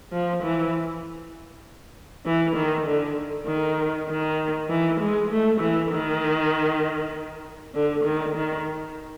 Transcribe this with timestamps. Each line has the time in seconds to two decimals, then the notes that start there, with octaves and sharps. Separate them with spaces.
0.12 F3
0.43 E3
2.25 E3
2.56 D#3
2.87 D3
3.47 D#3
4.09 D#3
4.70 E3
5.00 G#3
5.30 A3
5.60 E3
5.91 D#3
7.75 D3
8.04 D#3
8.35 D#3